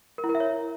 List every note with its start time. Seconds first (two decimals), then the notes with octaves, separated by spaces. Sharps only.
0.18 A#4
0.24 E4
0.29 A#4
0.35 E5
0.40 C#5